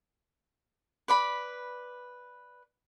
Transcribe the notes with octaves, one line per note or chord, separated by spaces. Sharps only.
B4 D5 B5